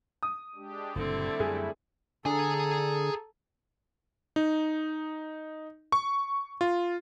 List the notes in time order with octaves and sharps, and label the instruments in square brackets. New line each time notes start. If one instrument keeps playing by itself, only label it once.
[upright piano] D#6
[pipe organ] G#3 D4 G4
[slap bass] F#1 A#2 [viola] D3 C4 [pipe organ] G3 A3 E4
[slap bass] F#2 [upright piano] G#4
[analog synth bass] D3 [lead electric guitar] G#4 G#5 [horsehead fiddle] A4 A#5
[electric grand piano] D#4
C#6
F4